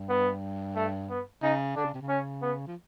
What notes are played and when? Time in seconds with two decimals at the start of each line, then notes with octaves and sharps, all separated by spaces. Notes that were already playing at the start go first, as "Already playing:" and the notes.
Already playing: G2
0.10 B3
0.76 A3
1.10 B3
1.42 C#3 D#4
1.76 D3 D4
1.85 C#3
1.94 C3
2.02 C#3
2.09 C#4
2.42 B3
2.67 F3